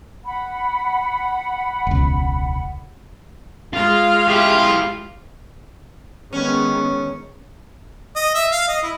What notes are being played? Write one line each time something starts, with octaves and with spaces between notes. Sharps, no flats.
F#5 B5
E1 C#2
G#3 F4 F5
E4 F4 G4
D#3 G#3 B3 C#4 C#5
D#5
E5
F5
D#5
E4